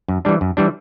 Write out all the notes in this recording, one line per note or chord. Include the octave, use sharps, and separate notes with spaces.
F#2
E3 G3 D4
F#2
E3 G3 D4